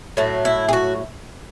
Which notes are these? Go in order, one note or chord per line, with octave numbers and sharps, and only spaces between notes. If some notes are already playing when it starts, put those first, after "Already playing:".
A2 F#3 A3
E4
G#4
F#4